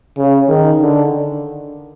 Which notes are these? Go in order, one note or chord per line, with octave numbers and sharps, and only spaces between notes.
C#3
D#3
D3